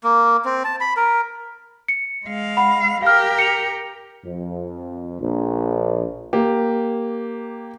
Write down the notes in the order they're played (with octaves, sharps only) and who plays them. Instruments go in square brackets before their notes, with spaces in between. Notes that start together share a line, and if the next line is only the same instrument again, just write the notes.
[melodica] A#3
C4
A5
B5
A#4
[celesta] C#7
[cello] G#3 F5
[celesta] F#5 B5
[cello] G4 A#4 [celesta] F5 F6
[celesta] C#7 F7
[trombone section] F2
A#1
[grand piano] A#3 G4